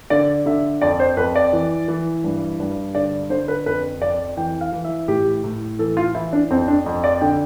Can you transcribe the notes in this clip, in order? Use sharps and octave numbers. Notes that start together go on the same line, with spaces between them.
D3 D5
D3 E5
F2 D5
C5
F2 B4
D5
E3
E3
G2
G2
D3 D5
D3 C5
B4
F2 B4
F2 D5
E3 G5
F5
E3
E5
A2 G4
A2
E3 A4
F4
E3 E4
D4
F2 C4
D4
F2
D5
D3 G5